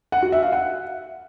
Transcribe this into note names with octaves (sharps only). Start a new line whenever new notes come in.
F#5
F#4
E5
F5
F#5